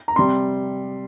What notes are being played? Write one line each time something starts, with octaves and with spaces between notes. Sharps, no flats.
A#5
C3 G3 C6